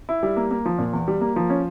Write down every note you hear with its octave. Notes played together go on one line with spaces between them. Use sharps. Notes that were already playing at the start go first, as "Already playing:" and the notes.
E4
G3
A#3
A#3
F3
A#2
E2
G3
A#3
F3
C#4